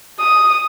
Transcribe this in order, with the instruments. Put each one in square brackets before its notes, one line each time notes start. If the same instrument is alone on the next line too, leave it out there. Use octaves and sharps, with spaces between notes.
[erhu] D#6